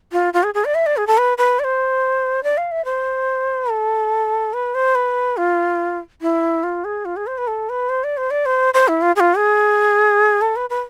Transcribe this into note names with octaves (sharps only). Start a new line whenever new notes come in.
F4
F4
G#4
G#4
D5
E5
D5
G#4
A4
B4
B4
D5
C5
D5
F5
E5
C5
A4
B4
C5
B4
F4
E4
F4
G#4
F4
G#4
C5
B4
A4
B4
C5
D5
C5
D5
C5
C5
E4
F4
G#4
F4
G#4
A4
B4
B4